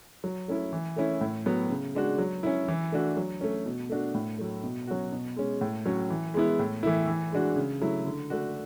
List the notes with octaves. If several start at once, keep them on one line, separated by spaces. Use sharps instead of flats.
F#3
A3 C#4 E4
E3
A3 C#4 E4
A2
F#3 B3
C#3
G#3 D4 F#4
F#3
C#4 E4
E3
A3 D4 F#4
F#3
A3 C#4
B2
A3 D4 F#4
A2
F#3 A3
B2
F#3 C#4 F#4
B2
G#3 C#4
A2
F#3 C#4 F#4
E3
G#3 B3 E4
A2
E3 A3 E4
E3
G#3 D4 F#4
C#3
F#3 A3 E4
D3
A3 D4 F#4